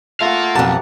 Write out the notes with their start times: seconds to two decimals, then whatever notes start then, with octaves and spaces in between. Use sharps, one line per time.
0.21 A3 F4 F5 F#5 A#5
0.55 B1 F2 G4 A#4 F#5 A5